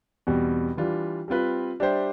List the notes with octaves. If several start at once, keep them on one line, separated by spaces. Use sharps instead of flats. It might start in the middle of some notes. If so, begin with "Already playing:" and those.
E2 B2 G3 C4
E3 G3 D4 F4
G3 C4 F4 B4
G3 D4 G4 C5 E5